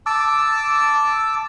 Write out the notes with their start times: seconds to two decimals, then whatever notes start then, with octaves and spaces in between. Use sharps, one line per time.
0.06 A5 D6 E6